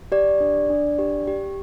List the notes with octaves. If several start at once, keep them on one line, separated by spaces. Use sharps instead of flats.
G4 D5
D4
D4
G4
G4